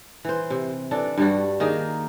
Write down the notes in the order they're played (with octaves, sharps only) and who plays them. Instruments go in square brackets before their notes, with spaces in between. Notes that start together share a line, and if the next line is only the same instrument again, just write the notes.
[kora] E3 C5
C3
E3 D4 A4
G2 G3 F#4
D#3 A#3 D#4 G#4